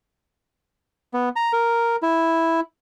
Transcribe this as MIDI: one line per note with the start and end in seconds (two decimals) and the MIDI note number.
1.14 1.29 59
1.36 1.52 82
1.53 1.96 70
2.03 2.60 64